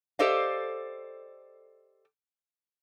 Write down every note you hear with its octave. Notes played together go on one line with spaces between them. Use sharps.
G4 A4 C5 D5 D#5 F5